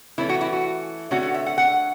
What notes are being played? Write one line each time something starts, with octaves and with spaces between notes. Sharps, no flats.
E3 A3 C#4 E4
F#4
E4
F#4
D3 A3 C#4 F#4
F#4
E5
F#5
F#5